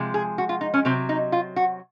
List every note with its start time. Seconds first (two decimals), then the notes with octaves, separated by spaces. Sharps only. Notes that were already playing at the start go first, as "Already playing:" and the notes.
Already playing: C3 F3 G#3
0.14 G#4
0.38 F#4
0.49 F4
0.61 D#4
0.74 C#4
0.85 C3 F#3 C4
1.09 D#4
1.32 F4
1.56 F#4